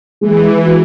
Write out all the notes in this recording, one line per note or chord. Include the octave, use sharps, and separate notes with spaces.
E3 G#3
F#4